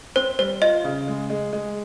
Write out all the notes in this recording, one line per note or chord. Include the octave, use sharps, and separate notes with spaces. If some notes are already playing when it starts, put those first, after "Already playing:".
C4 C5
G3 C5
F4 D#5
C#3
G#3
G#3
G#3